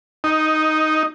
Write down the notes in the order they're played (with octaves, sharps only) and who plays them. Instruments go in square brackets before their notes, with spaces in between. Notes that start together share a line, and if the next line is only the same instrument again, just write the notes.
[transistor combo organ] D#4